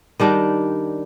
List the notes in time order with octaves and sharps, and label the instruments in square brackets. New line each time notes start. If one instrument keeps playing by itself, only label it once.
[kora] D#3 G3 D4 D#4